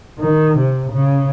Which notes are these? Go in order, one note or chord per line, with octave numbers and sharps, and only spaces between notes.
D#3
C3
C#3